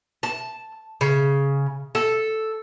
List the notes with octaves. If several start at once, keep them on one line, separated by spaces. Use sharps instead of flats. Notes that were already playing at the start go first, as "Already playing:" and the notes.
A5
C#3
A4